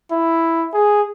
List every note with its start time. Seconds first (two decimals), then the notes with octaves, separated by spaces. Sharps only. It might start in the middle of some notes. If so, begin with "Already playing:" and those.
0.11 E4
0.73 G#4